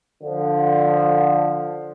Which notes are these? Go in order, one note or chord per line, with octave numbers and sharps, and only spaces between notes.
D3 F3